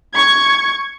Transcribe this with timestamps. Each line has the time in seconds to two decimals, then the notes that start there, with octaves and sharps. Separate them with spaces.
0.14 C#6 G#6